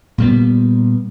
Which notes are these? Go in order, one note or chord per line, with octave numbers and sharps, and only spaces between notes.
A#2 G3 B3